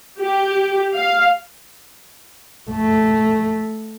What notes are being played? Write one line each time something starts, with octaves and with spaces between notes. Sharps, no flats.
G4
F5
A3